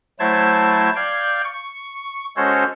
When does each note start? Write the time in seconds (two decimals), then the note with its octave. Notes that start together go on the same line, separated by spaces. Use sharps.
0.20 F#3 A3 E4 C5 A5 G#6
0.96 D5 F5 G5 G6 G#6
1.44 C#6
2.36 G#3 C#4 F#4 A4 C5 C#5